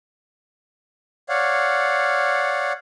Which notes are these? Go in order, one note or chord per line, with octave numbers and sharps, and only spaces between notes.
C#5 D5 F5 F#5